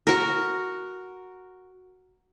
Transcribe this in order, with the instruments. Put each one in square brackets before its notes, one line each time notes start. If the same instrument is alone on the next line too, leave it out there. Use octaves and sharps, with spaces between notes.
[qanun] F#4 A#4